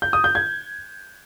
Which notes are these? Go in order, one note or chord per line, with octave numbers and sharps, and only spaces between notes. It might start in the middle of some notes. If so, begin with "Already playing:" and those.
G6
D#6
G6
G#6